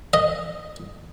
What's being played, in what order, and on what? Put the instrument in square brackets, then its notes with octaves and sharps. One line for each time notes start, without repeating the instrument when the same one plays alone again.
[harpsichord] D#5